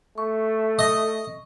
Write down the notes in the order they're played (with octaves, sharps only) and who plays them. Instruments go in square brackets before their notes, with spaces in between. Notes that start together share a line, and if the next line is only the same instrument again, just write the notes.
[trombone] A3 [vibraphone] C#6
[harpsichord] D#5